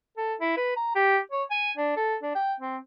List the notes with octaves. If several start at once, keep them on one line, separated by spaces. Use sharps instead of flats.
A4
E4
B4
A#5
G4
C#5
G#5
D4
A4
D4
G5
C4